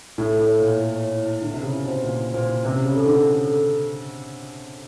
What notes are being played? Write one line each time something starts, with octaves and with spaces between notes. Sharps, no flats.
A2 A4
A2 A4
C#5
A#2
E4
E4
C#5
E4
E4
D3 E4
C3
C#3 E4
E4
B2 C5
A#2 E4
E4
A#2 C5
E4
C3 C#4
C#3 C#4
A4
D3
E4
C#4
A4